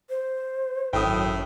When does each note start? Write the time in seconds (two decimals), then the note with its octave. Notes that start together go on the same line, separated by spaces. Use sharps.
0.10 C5
0.93 G#1 F#2 A2 G5 D#6